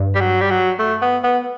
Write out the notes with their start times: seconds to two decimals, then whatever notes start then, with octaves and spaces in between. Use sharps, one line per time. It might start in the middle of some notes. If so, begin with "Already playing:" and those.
Already playing: G2
0.15 G3
0.20 F#3
0.41 G3
0.51 F#3
0.79 A3
1.02 B3
1.24 B3